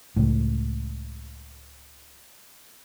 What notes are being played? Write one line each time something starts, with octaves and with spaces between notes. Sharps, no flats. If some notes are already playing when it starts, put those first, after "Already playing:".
C#2 A2